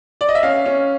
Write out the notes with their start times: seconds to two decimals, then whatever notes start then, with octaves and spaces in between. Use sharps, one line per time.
0.21 D5
0.29 D#5
0.35 E5
0.43 C#4 F5
0.66 C#4